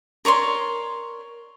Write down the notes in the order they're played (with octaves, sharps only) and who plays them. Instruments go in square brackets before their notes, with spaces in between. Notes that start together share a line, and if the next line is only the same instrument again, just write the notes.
[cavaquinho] A#4 C#5 D5 C6